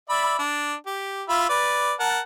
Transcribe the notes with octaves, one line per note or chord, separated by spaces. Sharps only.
D5 E5 B5
D4
G4
F4 E5 B5
B4 D5
A#4 F#5 A5